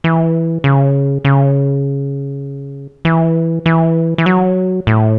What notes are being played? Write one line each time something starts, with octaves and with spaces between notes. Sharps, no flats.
E3
C#3
C#3
E3
E3
E3
F#3
A2